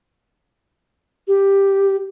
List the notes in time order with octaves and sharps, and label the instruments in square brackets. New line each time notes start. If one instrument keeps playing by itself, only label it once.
[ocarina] G4